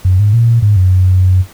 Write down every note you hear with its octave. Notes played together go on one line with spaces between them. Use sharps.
F#2
G#2
A#2
G#2
F#2